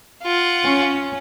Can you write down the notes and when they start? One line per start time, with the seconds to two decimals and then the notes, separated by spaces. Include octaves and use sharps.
0.23 F4 F#5
0.63 C#4